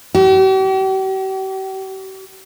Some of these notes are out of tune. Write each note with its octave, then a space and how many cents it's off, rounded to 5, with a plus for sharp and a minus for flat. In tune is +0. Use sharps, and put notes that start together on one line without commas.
G4 -45